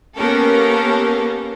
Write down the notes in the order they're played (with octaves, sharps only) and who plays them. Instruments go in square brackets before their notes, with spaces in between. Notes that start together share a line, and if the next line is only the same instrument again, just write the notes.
[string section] A#3 B3 C#4 G4 A4 A#4